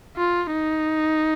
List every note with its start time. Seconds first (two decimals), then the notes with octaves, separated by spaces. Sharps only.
0.17 F4
0.53 D#4